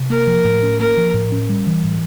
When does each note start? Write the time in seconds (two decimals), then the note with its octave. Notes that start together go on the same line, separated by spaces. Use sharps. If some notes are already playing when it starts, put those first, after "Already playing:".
Already playing: C3
0.10 A#3 A#4
0.27 F3
0.45 A2
0.63 C#4
0.79 A#3 A#4
0.97 F3
1.14 A2
1.32 C#4
1.49 G3
1.67 E3
1.84 A2